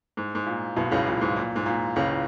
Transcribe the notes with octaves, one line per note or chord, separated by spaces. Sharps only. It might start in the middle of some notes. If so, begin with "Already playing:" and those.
G#2
G#2
A#2
B1 B2
C#2 C#3
A#2
G#2
A#2
G#2
A#2
C#2 C#3